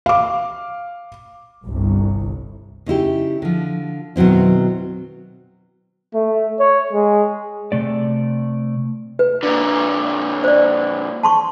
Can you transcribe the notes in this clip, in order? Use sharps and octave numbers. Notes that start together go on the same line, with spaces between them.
F5 D6
G1 C2
C#3 D#4 E4 G4
D3 F3
B2 D#3 F#3 C4 E4
A3
C#5
G#3
C3 A3 D5
B4
A#2 D3
C5 D5
A5 C6 C#6